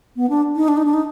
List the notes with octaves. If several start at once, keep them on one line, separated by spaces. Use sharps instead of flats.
B3
D4
D#4
D4
D#4
D4
D#4